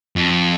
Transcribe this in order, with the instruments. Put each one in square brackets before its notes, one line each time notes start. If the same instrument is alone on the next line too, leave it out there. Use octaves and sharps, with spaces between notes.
[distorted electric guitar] F2